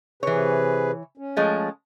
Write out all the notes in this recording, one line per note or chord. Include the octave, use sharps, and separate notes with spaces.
C3 E3 G#4 B4 C#5
C#4
F3 G#3 A3